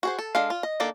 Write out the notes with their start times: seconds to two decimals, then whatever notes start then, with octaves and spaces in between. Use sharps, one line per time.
0.03 F#4 G#4 C5
0.19 A4
0.35 G#3 D4 A4 F5
0.50 F4
0.63 D#5
0.80 D#3 A#3 D4 A4 D5